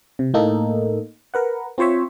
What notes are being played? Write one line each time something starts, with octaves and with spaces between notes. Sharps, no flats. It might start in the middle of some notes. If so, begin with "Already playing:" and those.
C3
A2 A#3 D#4 A4
A#4 B4 F#5
C4 F4 C5 C#5 E5